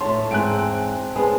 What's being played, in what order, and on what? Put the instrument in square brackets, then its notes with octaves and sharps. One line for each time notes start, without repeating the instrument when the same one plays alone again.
[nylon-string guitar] A2 C#5 [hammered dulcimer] A5 [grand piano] C6
[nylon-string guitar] E2 G#2 G#5 [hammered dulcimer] C4 [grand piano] F#6 D7
[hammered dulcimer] G#3 A5 [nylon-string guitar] B3 [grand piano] G#4